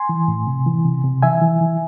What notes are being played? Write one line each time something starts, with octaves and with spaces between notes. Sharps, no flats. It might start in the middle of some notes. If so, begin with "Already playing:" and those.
Already playing: G#5 C6
E3
A2
C3
E3
C3
C3
E3 E5 G#5
E3
E3